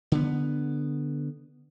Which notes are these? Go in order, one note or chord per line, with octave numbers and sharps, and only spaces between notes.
D3 B3